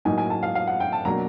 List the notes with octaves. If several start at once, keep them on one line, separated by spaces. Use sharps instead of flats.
A2 F#3 A#3 D#4 G#5
G#5
A5
F5
F5
F#5
G5
A5
B2 F#3 A#3 D4 A#5